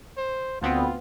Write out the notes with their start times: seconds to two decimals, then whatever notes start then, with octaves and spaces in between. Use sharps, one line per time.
0.17 C5
0.62 D2 B3 C4 F4